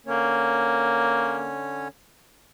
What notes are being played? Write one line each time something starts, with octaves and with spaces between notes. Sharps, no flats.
D3 A#3 C#4 C#5